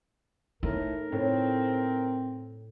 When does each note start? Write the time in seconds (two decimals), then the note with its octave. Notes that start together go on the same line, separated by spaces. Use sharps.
0.63 A2 D#4 A#4
1.12 A2 C4